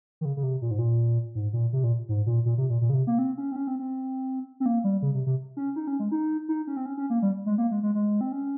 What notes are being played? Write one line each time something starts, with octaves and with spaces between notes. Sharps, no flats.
D#3
C#3
C#3
C3
A#2
G#2
A#2
G#2
A#2
C3
A#2
G#2
A#2
A#2
C3
A#2
A#2
C#3
C3
A#3
C4
C#4
C4
C#4
C4
C4
C4
A#3
G3
C#3
C3
C3
C#4
D#4
C#4
G#3
D#4
D#4
C#4
C4
C#4
C#4
A#3
G3
G#3
A#3
G#3
G#3
G#3
C4
C#4